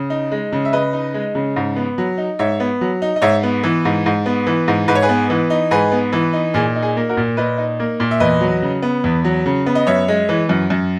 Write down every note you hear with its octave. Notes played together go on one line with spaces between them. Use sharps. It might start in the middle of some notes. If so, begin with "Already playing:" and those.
Already playing: C#3
D#4
G#3
C#3
E5
C#3 B4 D#5
D#4
G#3
C#3
G#2
B3
F#3
D#4
G#2 C#5 E5
B3
F#3
D#4
D#5
G#2 C#5 E5
B3
E3
G#2
G#2
B3
E3
G#2
G#2 B4
C#5
G#4 B4
B3
E3
D#4
G#2 G#4 B4
B3
E3
D#4
A#2 G#4
D#4
G#4
A#3
F#4 A#4
A#2
A#2 B4 D#5
D#4
A#3
A#2
E5
E2 B4 D#5
F#3
C#3
B3
E2
F#3
C#3
B3
D#5
F#2 C#5 E5
G#3
E3
F#2
F#2